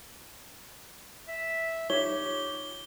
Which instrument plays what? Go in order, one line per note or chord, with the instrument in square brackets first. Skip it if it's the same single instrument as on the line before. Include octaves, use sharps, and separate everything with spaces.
[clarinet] E5
[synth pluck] D#4 F4 [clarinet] G4 [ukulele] C#5 [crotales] G7